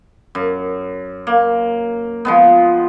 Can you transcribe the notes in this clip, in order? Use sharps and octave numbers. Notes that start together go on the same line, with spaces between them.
F#2
A#3
F3 G#3 B3